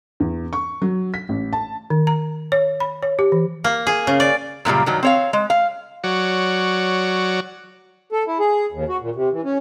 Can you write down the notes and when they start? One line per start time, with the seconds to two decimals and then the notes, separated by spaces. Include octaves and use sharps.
0.20 E2
0.53 C#6
0.82 F#3
1.14 B6
1.29 A1
1.53 A5
1.90 D#3
2.07 A#5
2.52 C#5
2.80 B5
3.03 C#5
3.19 G4
3.32 E3
3.64 A#3
3.87 G#4
4.07 C#3
4.20 D5
4.65 F#2 A#2 C#3 G3
4.86 G2 D#3 F#3
5.03 C4 C#5 F5
5.33 G#3
5.50 F5
6.04 F#3 F#4 C#5 D5
8.12 A4
8.27 E4
8.40 G#4
8.72 D#2
8.89 F#4
9.01 A#2
9.15 C3
9.32 E3
9.44 C#4